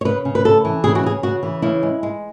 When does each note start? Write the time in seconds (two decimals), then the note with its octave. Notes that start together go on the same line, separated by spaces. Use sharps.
0.01 C#5
0.05 C#3 B4
0.25 C#3
0.35 B4
0.44 A3 A4
0.65 E3
0.84 C#3 G#4
0.95 F#4
1.03 C#3 G#4
1.23 C#3 F#4
1.43 E3
1.62 C#3 E4
1.83 G#3
2.03 G#3